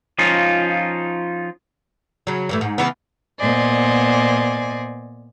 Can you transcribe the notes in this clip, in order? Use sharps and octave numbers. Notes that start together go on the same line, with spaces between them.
F3 C#4 D#4 F4
C#3 F#3
G2 E3 A3
G#2
C#3 E3 B3
A#2 B3 C5 D5 D#5 G#5